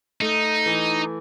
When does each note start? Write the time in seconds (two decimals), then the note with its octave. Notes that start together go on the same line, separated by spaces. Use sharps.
0.21 A3 D#4
0.66 E3